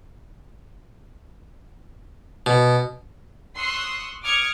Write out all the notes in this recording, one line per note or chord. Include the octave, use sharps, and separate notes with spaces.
B2
C6 C#6 D#6 E6 F#6 C7
D6 D#6 F6 G#6 C#7